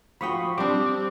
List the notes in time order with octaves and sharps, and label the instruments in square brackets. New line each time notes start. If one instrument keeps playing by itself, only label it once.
[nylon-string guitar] F3 F#4 G5 [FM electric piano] B5 C#6 D#6
[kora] G3 D4 [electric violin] C4 [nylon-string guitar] C5 [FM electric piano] D6